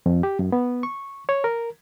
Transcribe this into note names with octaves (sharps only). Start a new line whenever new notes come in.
F2
G4
F#2
B3
C#6
C#5
A#4